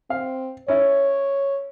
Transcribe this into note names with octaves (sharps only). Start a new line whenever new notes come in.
C4 F5
C#4 E4 C#5